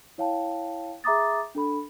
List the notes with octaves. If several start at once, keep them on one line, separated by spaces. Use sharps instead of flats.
E4 C#5 F5 G5 A5
G#4 E5 A#5 D6 D#6 A6
D4 A4 B5